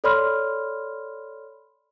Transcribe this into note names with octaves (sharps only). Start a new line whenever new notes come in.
A4 C#5 D5 B5 C6 F6